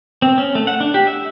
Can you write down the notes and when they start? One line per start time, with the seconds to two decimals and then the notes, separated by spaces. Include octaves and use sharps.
0.22 C4
0.38 C#4
0.55 A3
0.67 F#5
0.81 D4
0.94 G4
1.07 E5